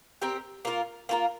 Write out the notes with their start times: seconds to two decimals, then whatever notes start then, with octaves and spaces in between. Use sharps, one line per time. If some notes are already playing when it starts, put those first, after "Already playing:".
0.22 C4 G4 A#4
0.65 A#3 F4 A#4
1.09 A#3 F4 A#4